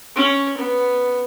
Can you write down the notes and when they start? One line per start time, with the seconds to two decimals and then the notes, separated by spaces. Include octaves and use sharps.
0.16 C#4
0.57 B3